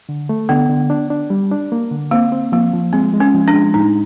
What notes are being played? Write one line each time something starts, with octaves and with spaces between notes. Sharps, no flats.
D3
A3
D3 B3
D3
D4
D4
G3
D4
A#3
D3
A#3 C4
C4
F3 A#3
F3
G#3 C4
G#3
C#4
F3
D4
G#3
A2 D#4